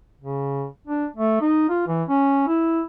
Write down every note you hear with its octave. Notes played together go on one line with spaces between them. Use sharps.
C#3
D4
A3
D#4
F4
E3
C#4
E4